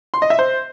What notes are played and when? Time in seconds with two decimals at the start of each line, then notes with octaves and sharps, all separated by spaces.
0.14 C6
0.22 D#5
0.30 E5
0.39 C5